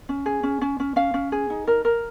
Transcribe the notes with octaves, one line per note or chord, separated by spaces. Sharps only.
C#4
G#4
C#4
C#4
C#4
C#4 F5
C#4
G#4
D#4
A#4
A#4